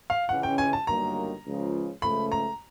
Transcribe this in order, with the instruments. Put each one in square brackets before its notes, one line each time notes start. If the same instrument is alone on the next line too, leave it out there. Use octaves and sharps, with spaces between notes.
[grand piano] F5
[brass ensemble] C#2 C#3 E3 G#3 C#4 [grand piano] F#5
[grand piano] G5
G#5
A5
[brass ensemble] G1 G2 D#3 F#3 A#3 [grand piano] A#5
[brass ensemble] C#2 C#3 F3
[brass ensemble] C#2 C#3 F3 A3 [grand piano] B5
[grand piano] A#5